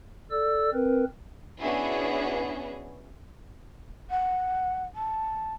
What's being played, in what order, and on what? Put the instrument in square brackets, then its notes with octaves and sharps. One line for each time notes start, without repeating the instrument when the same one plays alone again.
[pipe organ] A4 D5 E6
C4 A#4 B4
[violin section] B3 C#4 D4 E4 F#4 G#4
[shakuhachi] F#5
A5